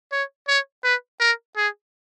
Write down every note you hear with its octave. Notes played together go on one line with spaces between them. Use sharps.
C#5
C#5
B4
A#4
G#4